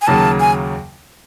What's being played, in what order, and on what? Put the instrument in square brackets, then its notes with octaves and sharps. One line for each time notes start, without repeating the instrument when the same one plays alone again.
[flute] G#5
[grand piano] D#2 C#3 F#3 A#3 [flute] A5
[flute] G#5